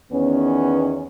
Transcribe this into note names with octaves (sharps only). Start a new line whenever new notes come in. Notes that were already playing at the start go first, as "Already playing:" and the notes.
E2 D#3 B3 C#4